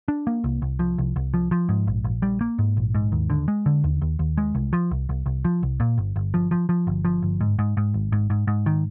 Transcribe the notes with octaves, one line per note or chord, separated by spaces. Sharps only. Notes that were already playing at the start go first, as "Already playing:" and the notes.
D4
A#3
C2
C2
F3
C2
C2
F3
F3
G#2
A#1
A#1
G3
A#3
G#2
A#1
G#2
D#2
D3
G#3
D3
D#2
D#2
D#2
G#3
C2
F3
C2
C2
C2
F3
C2
A#2
G1
G1
F3
F3
F3
G1
F3
G1
G#2
G#2
G#2
G#1
G#2
G#2
G#2
D#3